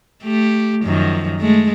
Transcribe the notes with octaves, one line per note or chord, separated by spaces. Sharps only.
A3 G4
F#2 D#3 F3
G#3 A3